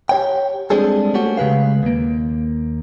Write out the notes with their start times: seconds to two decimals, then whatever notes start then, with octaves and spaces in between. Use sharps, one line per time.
0.09 G4 C#5 G5
0.70 G3 G#3 C4 D4 G#4 A4
1.14 A3 A#3 C#4 F#4 G4 A4
1.37 C#3 G#3 B4 F5
1.83 D#2 A#3